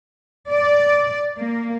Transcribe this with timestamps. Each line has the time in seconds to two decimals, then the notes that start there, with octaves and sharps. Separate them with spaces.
0.50 D5
1.38 A#3